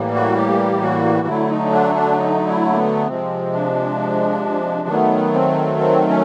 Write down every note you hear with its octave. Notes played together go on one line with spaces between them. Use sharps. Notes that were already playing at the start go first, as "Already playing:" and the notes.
Already playing: A2 E3 G3 A#3
F#4
G4
F#4
D3 F#3 A3 E4
D#4
D4
D4
D#4
E4
A#3
B3
C3 F3 G#3 C4
D4
D#3 F#3 A3 B3
C4
C4
C#4